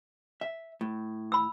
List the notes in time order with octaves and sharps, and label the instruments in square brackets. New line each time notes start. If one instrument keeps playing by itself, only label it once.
[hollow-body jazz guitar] E5
A2
[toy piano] B5 E6